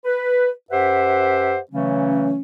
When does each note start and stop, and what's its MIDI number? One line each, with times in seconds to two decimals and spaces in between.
0.05 0.49 71
0.71 1.58 42
0.71 1.58 67
0.71 1.58 71
0.71 1.58 72
0.71 1.58 76
0.71 1.58 78
1.71 2.40 49
1.71 2.40 52
1.71 2.40 54
1.71 2.40 57
1.71 2.40 61